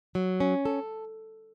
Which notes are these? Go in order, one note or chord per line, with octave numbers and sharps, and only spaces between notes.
F#3
C#4
A4